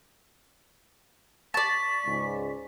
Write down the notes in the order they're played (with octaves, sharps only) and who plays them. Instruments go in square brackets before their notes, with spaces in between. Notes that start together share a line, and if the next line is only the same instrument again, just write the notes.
[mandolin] D5 A5 [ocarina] C#6 [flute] B6
[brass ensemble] C#2 G#2